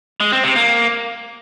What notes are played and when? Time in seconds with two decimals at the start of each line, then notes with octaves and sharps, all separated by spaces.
0.20 G#3
0.32 C4
0.44 C3
0.56 A#3